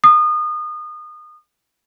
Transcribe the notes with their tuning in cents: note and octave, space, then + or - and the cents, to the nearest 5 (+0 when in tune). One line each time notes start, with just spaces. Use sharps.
D#6 -30